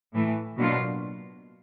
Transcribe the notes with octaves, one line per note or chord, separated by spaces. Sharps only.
A2 E3 A3
B2 F#3 A#3 D4 F4